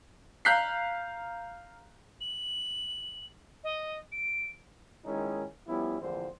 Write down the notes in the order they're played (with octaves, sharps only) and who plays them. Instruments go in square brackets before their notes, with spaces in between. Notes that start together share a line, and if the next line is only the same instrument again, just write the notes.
[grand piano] F5 A#5 F#6 G6 B6 C7
[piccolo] F#7
D#5
D7
[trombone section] A#2 D#3 G#3 C#4 D#4 E4
F3 G3 B3 C#4 E4
A#1 F2 A2 D3 E3 C5